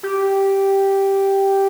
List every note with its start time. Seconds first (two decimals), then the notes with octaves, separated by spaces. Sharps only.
0.03 G4